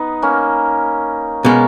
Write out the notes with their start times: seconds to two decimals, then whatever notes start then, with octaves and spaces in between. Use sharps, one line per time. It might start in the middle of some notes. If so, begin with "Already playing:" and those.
Already playing: B3 D#4
0.22 A#3 C#4
1.45 B2 G#3 A#3 C#4